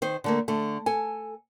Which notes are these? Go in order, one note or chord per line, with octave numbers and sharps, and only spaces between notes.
D#3 C5
D3 A3 A#3
D3 A3
A4 G#5